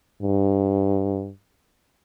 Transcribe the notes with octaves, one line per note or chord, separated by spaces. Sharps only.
G2